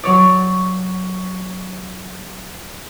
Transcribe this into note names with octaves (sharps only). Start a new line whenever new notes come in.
F#3 C#5 D5